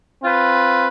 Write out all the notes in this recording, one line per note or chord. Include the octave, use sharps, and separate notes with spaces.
C4 F4 B4